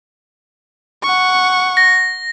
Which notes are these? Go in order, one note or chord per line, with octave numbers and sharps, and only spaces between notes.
F#5 C#6
A#6